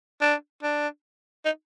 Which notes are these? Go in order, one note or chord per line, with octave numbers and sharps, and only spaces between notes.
D4
D4
D#4